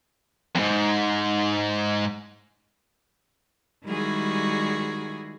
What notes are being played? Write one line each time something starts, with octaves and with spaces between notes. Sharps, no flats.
F2 G#2
D#3 G3 G#3 E4 F#4 G#4